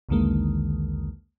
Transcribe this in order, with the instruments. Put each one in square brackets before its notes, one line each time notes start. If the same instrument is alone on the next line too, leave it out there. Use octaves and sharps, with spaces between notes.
[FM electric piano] B1 E2 D3 D#3 G#3 A#3